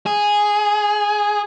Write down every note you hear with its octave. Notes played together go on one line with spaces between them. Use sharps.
G#4